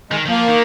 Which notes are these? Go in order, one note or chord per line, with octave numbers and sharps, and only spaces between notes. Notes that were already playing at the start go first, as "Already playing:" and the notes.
D#3 G#3
D#3
F3 A#3
D#3